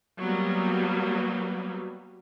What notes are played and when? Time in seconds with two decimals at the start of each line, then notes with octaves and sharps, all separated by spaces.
0.19 F#3 G3 A#3 B3